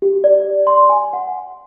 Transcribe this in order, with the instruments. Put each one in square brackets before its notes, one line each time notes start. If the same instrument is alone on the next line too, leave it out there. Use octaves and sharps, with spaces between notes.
[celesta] G4
D5
C6
G#5
F#5